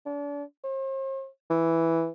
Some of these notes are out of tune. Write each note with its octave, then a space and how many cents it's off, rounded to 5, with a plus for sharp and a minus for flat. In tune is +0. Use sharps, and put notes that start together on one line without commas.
D4 -35
C5 +45
E3 +0